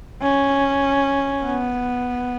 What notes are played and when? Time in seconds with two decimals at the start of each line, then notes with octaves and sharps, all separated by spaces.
0.22 C#4
1.43 B3